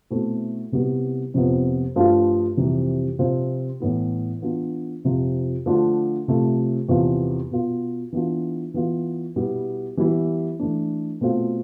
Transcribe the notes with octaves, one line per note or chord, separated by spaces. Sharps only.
B2 A3 C4 E4
C3 G3 B3 E4
F2 C3 F3 B3
G2 F3 A3 D4 F4
F2 C3 E3 G3
C3 F3 C4 F4
A2 E3 B3 E4
E3 B3 D4 F4
F2 C3 F3
D3 F3 A3 D4 F4
C3 F3 A3
E2 C3 F3 B3 F4
B2 B3 F4
E3 B3 D4 F4
E3 B3 F4
B2 G3 B3 E4
E3 G3 B3 E4
E3 A3 D4
B2 A3 C4 F4